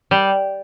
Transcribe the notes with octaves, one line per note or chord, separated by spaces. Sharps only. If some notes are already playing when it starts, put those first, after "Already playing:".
G3